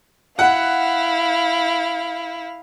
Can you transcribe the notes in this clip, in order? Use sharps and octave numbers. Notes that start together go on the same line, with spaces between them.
E4 F5 F#5